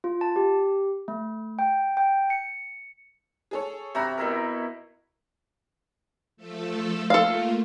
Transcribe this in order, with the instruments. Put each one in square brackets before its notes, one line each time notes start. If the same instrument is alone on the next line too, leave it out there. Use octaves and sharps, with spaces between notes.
[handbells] F4
A5
G4
A3
G5
G5
C#7
[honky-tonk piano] G#4 A4 C#5
[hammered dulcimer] C3 F#4 [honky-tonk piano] E5 A#5 B5
[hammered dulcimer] B2 E4 A#4
[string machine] F3 A3 A4
[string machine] A3 A#3 F4 [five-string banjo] A4 F5